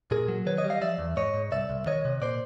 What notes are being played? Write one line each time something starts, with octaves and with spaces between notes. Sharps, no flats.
A#2 G#4 A#4
F#3
D#3 B4 C#5
C#5 D#5
G3
D#5 F5
F3 D5 E5
E2
G#2 C#5 D#5
G#2
C2 D5 E5
C2
D#3 C#5 D#5
C3
A#2 C5 D5